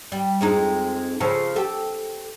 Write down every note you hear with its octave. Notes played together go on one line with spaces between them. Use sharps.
G3
F2 G#3 D#4
C#3 F3 A4
G4 A4